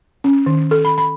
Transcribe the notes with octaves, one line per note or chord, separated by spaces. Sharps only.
C#4
D#3
A4
B5
B5